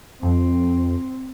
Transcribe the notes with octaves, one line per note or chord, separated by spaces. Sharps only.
F2 C4